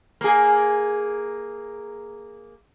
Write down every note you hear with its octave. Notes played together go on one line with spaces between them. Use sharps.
A#3 G#4